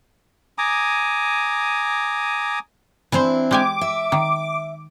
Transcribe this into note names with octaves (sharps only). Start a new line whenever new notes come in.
G#5 A#5 D6 D#6
E3 C4 D4 E4 C5
G#3 G4 G#5 D6
E5
D#3